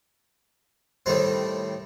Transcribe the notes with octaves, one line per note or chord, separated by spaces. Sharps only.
A2 D#3 G3 C4